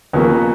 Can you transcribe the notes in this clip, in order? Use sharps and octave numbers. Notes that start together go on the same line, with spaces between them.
D#2 C#3 F3 A#3 B3